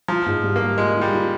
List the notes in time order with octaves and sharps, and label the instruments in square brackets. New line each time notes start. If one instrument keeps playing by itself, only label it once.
[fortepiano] F3 [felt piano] F4
[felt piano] G#2
G3
[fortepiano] A#3
[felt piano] G3
[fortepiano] G#3 [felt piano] F4
[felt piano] F4
[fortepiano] G3
[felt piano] F4